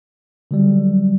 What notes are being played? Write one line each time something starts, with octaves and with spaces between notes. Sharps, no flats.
D3 F#3 G3